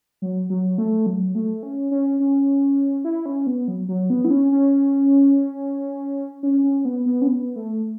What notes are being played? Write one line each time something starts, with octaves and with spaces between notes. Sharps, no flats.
F#3
F#3
A3
F#3
A3
C#4
C#4
C#4
E4
C#4
B3
F#3
F#3
B3
E4
C#4
C#4
C#4
C#4
B3
B3
C#4
B3
A3